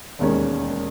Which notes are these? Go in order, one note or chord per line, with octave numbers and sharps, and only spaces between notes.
E1 D#2 D#3 G#3 C#4